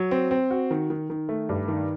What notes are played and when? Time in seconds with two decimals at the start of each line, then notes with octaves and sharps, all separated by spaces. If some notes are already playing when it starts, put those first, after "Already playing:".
Already playing: F#3
0.11 C4
0.31 C4
0.51 F#4
0.71 D#3
0.90 D#3
1.10 D#3
1.29 A3
1.49 G2
1.68 D#3